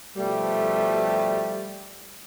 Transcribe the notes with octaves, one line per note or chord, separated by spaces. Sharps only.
B2 F3 G3 A3